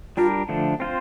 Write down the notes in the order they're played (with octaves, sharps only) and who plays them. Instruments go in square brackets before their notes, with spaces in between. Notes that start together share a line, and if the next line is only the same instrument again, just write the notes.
[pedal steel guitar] G3 D4 G4 A#4 [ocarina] F4
[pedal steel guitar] D3 F3 A3 D4
C4 F4 C5